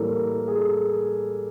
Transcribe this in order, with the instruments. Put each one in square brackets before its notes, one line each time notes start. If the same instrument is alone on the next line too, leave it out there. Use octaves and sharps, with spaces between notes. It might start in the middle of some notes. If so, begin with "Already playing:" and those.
Already playing: [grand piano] A2 E3 G3 A#3 A4 A#4
G#4
A4